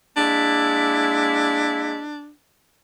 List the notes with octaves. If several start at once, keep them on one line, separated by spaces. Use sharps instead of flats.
G#3 A#3 D4 E4